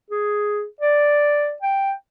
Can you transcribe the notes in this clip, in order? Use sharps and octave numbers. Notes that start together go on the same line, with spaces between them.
G#4
D5
G5